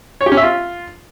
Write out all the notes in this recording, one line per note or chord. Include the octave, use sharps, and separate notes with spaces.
C#5
G4
C#4
E5
F4